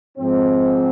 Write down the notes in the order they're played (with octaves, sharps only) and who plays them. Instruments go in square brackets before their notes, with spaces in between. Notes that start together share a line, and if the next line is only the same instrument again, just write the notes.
[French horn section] G#2 F3 C4